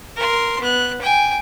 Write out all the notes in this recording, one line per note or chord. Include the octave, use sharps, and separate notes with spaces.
A#4 C6
B3 F#6
G5 G#5